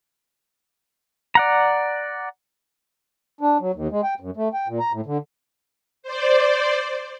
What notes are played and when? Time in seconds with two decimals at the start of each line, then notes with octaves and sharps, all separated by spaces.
1.35 D5 F#5 A#5
3.41 D4
3.60 F#3
3.74 D#2
3.91 G#3
4.03 G5
4.20 F#2
4.37 A3
4.54 G5
4.68 A#2
4.79 A#5
4.92 A2
5.06 D3
6.03 C5 D5